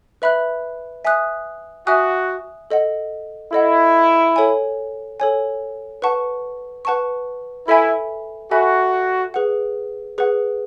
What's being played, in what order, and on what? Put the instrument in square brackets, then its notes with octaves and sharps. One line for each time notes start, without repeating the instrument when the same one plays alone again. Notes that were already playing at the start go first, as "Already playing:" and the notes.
[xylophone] B4 E5 B5 F#6
E5 G#5 D#6 F#6
[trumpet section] F#4 [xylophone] E5 G#5 D#6 F#6
[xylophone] A4 D#5 F#5
[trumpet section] E4 [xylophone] A4 D#5 F#5
[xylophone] A4 C#5 G#5
A4 C#5 G#5
B4 F#5 A5 C#6
B4 F#5 A5 C#6
[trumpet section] E4 [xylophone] A4 E5 G#5 B5
[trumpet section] F#4 [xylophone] A4 E5 G#5 B5
[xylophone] G#4 B4 F#5
G#4 B4 F#5